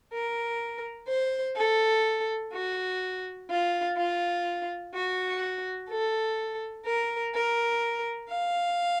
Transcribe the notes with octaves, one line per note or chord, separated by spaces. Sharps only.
A#4
C5
A4
F#4
F4
F4
F#4
A4
A#4
A#4
F5